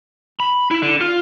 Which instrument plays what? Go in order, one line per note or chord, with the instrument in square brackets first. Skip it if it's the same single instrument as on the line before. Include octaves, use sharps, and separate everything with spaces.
[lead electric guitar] B5
E4
D3
F4